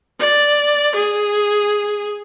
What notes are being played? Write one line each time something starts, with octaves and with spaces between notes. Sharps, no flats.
D5
G#4